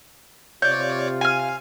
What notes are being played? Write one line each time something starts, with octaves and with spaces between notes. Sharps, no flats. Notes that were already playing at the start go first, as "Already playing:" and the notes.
C3 F4 C#5 D5 G6
F5 G#5 F6